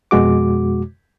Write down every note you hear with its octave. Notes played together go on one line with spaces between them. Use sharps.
F2 B2 G#3 F#4 D6